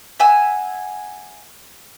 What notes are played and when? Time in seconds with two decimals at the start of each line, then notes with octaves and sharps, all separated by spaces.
0.20 E5 F#5 G#5 E6